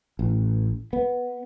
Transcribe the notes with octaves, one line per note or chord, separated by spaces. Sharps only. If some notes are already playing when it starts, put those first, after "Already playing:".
A1
B3